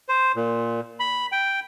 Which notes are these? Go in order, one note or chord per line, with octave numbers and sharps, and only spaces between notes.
C5
A#2
B5
G5